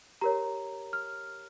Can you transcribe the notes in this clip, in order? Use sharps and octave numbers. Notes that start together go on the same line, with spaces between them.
G4 A#4 C#5 A#5
F6